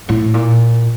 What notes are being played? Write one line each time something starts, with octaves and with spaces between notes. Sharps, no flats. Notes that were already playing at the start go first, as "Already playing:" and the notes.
A2
A#2